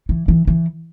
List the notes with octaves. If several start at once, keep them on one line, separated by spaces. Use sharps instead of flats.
E3
E3
E3